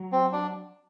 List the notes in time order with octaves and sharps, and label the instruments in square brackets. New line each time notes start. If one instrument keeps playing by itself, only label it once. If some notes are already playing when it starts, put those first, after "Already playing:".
Already playing: [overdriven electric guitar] F#3
[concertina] C4
D4